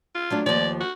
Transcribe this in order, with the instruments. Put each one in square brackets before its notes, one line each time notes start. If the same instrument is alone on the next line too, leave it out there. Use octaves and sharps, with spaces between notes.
[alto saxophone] F4
[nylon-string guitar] F#3 A3 D4
[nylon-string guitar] D#2 F3 [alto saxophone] D5
[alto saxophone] F#4